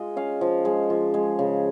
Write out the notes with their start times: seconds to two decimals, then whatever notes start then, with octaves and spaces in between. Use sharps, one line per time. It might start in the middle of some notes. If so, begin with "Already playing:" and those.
Already playing: G#3 F4 D#5
0.16 C#4 F5
0.41 F3
0.65 G#3
0.90 F3
1.14 G#3
1.39 C#3